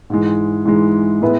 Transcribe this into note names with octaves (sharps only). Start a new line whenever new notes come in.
G#2 E3 G#3
G#2 E3 G#3
A2 G#3 B3 E4 B4